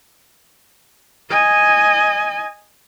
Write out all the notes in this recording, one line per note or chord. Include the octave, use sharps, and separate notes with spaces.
D#5 G#5